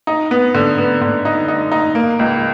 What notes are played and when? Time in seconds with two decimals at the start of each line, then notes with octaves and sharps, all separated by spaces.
0.07 D#4
0.31 B3
0.55 D3
0.78 B3
1.01 D3
1.25 D#4
1.48 D#4
1.72 D#4
1.95 A#3
2.19 C#2